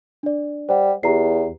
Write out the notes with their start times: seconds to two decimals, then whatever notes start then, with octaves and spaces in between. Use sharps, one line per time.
0.23 D4 D5
0.69 G3 C5 F#5
1.03 E2 G4 A#5 C7